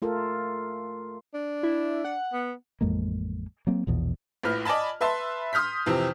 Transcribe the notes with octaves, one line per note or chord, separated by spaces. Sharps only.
A3 F4 A4 A#4
D4
E4
F#5
B3
A1 F2 G#3 A#3
F#3 A#3 C4
A#1 E2 B2
A#1 A2 B4 F6
D5 D#5 G#5 A5 B5
B4 E5 A5 C6
C6 D#6 F6 G6 B6
F2 C3 E3 C4